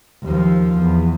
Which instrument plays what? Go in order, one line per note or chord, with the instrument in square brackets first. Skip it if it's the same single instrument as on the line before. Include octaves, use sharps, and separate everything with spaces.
[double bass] D#2 F3
E2